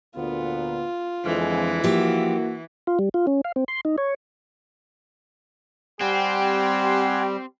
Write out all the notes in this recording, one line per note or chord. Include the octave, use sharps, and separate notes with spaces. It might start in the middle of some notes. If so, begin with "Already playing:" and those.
D2 A#2 B3 F4
F2 D3 E3 G#3
F3 A#3 E4 F#4 G4
F4
G3
F4
C#4
F5
C4
C6
D#4
C#5
G3 C4 G4 F#5 G#5 C6